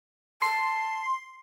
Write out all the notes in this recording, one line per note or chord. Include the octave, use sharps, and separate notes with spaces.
A5 C6 C7